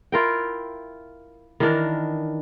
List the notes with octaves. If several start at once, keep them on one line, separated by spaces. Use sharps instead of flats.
E4 F4 A#4 G5
D#3 E3 D4 A#4